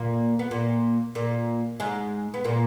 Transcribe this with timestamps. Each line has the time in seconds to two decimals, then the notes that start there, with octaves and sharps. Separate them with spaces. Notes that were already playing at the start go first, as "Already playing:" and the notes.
Already playing: A#2 A#3
0.39 B3
0.51 A#2 A#3
1.15 A#2 A#3
1.80 G#2 G#3
2.34 B3
2.44 A#2 A#3